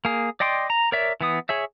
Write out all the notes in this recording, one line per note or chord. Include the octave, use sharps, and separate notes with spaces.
A#3 G#4
D5 D#5 G5 C6 D6
A#5
A#4 C#5 D5 E5
E3 B3 D#6
G#4 C#5 E5